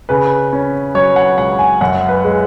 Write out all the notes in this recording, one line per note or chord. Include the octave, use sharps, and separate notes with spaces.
C#3 B4
C#4
F#3 C#5
F#5
C#2 F#5
G#5
F#2 F#5
B4
G#3